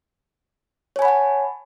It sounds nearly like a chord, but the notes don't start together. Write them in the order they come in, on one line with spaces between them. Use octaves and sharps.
C#5 G#5 B5 F#5 A5